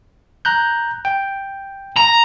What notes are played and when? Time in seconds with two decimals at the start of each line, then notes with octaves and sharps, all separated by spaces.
0.45 A#5 F#6 G6
1.05 G5
1.96 A#5